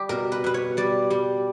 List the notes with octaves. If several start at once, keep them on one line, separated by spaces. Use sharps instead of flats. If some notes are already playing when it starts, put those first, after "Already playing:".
Already playing: G3 G4
B2 A#4
B4
B2 B4
C#5
G3 D5
G3